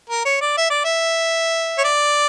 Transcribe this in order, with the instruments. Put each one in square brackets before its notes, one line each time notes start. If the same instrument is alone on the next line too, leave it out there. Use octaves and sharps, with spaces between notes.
[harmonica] A#4
C#5
D5
E5
D5
E5
C#5
D5